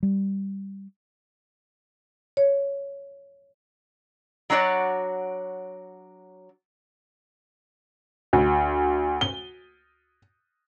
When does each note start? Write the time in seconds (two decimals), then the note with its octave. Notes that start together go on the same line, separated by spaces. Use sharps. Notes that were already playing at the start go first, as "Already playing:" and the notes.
0.03 G3
2.37 C#5
4.50 F#3 D4 F#4 C#5 D5
8.33 D2
9.21 G7